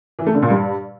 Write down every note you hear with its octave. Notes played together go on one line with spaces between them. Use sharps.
E3
A3
D3
A#2
G2